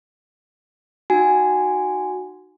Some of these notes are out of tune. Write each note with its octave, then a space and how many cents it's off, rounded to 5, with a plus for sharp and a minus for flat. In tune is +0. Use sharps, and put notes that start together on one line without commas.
D#4 -15 F#4 +0 G#5 -5